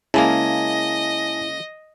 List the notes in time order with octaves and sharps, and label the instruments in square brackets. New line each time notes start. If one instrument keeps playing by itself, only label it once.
[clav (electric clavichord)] C#3 G#3 A#3 [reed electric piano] E4 [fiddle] D#5 [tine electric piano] G#5 A5